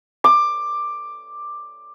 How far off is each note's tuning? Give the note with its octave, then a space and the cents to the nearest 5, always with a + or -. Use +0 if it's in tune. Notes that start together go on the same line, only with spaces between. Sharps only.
D6 +10